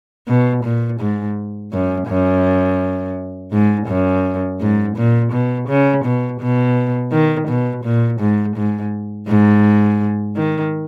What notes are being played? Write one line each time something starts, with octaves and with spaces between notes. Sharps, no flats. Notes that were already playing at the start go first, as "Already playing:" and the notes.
B2
A#2
G#2
F#2
F#2
G#2
F#2
G#2
A#2
B2
C#3
B2
B2
D#3
B2
A#2
G#2
G#2
G#2
D#3